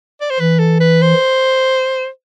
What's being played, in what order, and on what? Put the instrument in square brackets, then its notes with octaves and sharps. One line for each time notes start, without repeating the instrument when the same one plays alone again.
[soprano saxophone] D5
C5
[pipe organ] E3 [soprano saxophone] B4
[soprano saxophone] A4
B4
C5